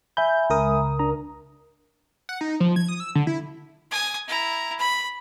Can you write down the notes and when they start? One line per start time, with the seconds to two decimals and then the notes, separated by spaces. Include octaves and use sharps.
0.17 E5 G#5 B5 G6
0.50 C#2 A#4 D#6
0.99 D4 A#5
2.29 F#5
2.41 D#4
2.60 F3
2.76 G#6
2.88 D#6
3.00 E6
3.15 D3
3.27 E4
3.91 G#5 D#6
4.28 E4 A#5
4.79 B5